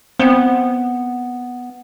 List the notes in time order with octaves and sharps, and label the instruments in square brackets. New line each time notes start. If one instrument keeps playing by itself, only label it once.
[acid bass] B3 [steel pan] C4